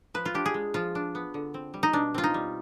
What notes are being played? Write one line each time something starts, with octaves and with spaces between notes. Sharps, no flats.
F3 B4
F4
D4 G4
G#4
G#3
F3 F4
D4
B3
D3
C4
G3
D#4
B2 D4
C4 F4
D#4
G3